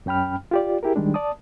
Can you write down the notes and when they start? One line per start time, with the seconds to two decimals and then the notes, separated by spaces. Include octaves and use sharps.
0.06 F#2 C#4 G5 B5 F6
0.51 F4 G4 D5
0.83 E4 G4 G#4 A#4
0.96 D#3 G3 G#3 D4
1.14 D5 A5 D#6